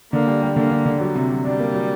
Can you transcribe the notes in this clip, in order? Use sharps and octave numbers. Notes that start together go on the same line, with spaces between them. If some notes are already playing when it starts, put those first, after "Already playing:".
D3 A#3
G3
G3
D3 A#3
D3
D3
F#3 G3
C3
F#3
G3 D4
A#3
F#3